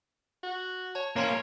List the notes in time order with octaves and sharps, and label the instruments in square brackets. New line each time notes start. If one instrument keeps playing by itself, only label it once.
[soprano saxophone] F#4
[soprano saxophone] C#5 [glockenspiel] A5
[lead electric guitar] A#3 C#4 [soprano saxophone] C#5 [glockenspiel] A#5 C6 G#6